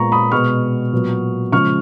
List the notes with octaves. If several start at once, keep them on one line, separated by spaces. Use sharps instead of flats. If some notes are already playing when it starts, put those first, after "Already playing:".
Already playing: A#2 G#3 B3 A#5 C#6
B5 D#6
B2 G#3 B3 C#6 F6
A#2 F#3 B3
C#3 F3 G#3 C#6 F6